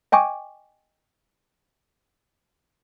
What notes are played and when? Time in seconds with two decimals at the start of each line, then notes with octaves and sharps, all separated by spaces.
0.12 D#5 G5 G#5 C#6 D6